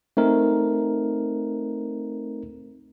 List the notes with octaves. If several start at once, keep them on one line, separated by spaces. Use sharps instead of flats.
A3 C4 D#4 A#4